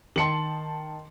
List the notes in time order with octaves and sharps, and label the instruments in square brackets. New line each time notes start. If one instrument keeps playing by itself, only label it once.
[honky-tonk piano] D#3 A5 [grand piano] C6 C#7 F#7